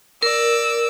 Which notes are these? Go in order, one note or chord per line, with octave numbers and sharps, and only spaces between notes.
A#4 D5 E6